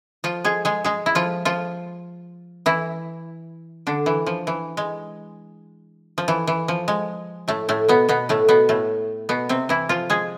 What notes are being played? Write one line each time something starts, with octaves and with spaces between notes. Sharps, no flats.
F3 F4
G#3 G#4
G#3 G#4
G#3 G#4
E4
F3 F4
F3 F4
E3 E4
D3 D4
E3
F3
E3
G#3
F3
E3
E3
F3
G#3
A2 A3
A2 A3
B2 B3
B2 B3
A2 A3
B2 B3
A2 A3
B2 B3
C3 C4
E3 E4
F3 F4
G#3 G#4